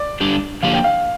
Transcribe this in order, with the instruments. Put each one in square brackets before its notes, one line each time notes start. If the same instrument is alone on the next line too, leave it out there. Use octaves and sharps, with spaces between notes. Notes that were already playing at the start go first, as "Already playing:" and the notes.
Already playing: [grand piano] D5
[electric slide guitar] D3 G3 D4 G4
[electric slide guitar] D3 F3 A#3 G4 [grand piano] F5
[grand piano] G5
F5